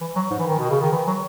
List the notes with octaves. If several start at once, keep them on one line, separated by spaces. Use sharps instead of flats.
E3
F#3
G#2
E3
D#3
B2
C#3
D#3
E3
F#3